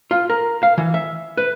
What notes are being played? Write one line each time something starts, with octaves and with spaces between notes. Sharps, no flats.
F4
A#4
F5
E3
E5
B4